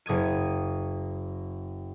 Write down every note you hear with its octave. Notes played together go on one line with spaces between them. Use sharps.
F#1 D#6 G#6 D#7